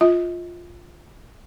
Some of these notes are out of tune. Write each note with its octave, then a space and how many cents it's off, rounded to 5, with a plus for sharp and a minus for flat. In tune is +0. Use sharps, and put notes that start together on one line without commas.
F4 +0 D#5 +40